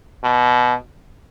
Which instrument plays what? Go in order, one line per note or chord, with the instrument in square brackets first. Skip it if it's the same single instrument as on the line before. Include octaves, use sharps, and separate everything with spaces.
[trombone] B2